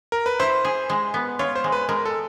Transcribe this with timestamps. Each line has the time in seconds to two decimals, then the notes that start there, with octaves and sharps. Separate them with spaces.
0.12 A#4
0.26 B4
0.39 E4 C5
0.65 G#4
0.90 G#3
1.14 B3
1.39 F4 C#5
1.55 C5
1.64 G#3
1.72 B4
1.89 G#3 A#4
2.05 A4